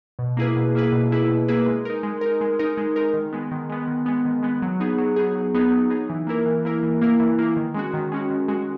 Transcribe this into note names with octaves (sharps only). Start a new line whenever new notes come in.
B2
A#3 E4 G#4 B4
B2
A#3 E4 G#4 B4
B2
A#3 E4 G#4 B4
B2
A#3 E4 G#4 B4
G#3
D#4 A#4
G#3
D#4 A#4
G#3
D#4 A#4
G#3
D#4 A#4
D#3
G#3 B3
D#3
G#3 B3
D#3
G#3 B3
D#3
G#3 B3
F#3
B3 D#4 G#4
F#3
B3 D#4 G#4
F#3
B3 D#4 G#4
F#3
B3 D#4 G#4
E3
A#3 E4 A#4
E3
A#3 E4 A#4
E3
A#3 E4 A#4
E3
A#3 E4 A#4
D#3
G#3 C#4 F#4
D#3
G#3 C#4 F#4
D#3
G#3 C#4 F#4